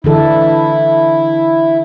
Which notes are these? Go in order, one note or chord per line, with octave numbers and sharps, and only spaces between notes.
D3 E3 E4 A4